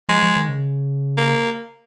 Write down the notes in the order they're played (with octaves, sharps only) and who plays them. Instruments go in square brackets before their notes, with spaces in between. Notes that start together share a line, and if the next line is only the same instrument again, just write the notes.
[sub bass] F3 [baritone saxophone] G#3
[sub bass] F3
D#3
C#3
[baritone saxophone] A#3